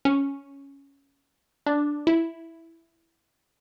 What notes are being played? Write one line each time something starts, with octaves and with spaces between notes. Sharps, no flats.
C#4
D4
E4